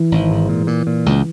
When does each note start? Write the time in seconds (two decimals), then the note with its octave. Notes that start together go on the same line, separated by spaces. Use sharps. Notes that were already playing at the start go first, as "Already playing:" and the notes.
Already playing: E3
0.11 G#1
0.31 G#2
0.49 A#2
0.67 A#2
0.87 A#2
1.06 C#2